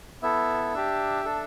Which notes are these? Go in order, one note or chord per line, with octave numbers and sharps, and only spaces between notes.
B3 E4 A4 E5
D4 G4
D4 A4